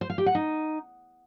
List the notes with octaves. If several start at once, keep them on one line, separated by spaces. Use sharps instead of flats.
C5
F5
G4
F#5
D#4